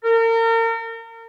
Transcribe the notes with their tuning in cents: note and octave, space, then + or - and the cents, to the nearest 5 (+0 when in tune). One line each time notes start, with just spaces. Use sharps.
A#4 -35